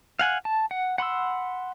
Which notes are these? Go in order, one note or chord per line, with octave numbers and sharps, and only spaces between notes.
F5 F#5 G#5 F#6
A5
F#5
F#5 B5 C6 E6